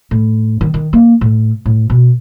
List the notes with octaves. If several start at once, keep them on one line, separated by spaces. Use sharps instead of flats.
A2
D#3
D#3
A#3
A2
A2
B2